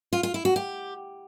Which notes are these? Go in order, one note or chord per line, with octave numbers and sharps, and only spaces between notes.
F4
F4
E4
F#4
G4